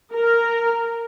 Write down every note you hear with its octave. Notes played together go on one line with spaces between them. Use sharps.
A#4